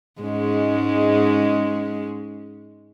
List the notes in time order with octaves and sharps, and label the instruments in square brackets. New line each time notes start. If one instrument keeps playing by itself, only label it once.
[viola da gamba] G#2 G#3 C#4